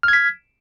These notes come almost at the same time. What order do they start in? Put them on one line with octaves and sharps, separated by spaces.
F6 G#6 B6